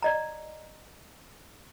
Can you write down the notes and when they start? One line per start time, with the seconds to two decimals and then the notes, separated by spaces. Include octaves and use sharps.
0.03 D5 D#5 A#5